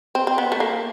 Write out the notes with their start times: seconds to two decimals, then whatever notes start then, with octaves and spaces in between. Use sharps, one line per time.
0.15 C4
0.27 C4
0.38 B3
0.52 A3
0.60 A#3